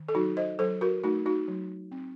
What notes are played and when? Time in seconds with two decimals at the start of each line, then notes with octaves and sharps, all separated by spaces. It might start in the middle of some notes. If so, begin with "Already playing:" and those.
Already playing: D#3
0.08 A4
0.15 F#3 D#4 F#4
0.37 C5 D#5
0.59 F#3 A4 C5
0.81 F#4 A#4
1.03 A3 D#4 F#4
1.26 D#4 F#4
1.48 F#3
1.92 C4